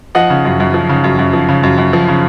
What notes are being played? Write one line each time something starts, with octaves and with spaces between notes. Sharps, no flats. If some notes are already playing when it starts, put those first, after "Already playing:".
F3 D#5 F#5
C#3
F#2
F#2
F3
C#3
F#2
F#2
F3
C#3
F#2
F#2
F3
C#3